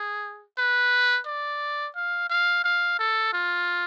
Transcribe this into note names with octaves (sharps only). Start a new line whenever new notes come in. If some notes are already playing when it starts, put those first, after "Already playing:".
Already playing: G#4
B4
D5
F5
F5
F5
A4
F4